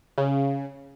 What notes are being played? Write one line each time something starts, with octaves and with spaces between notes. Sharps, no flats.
C#3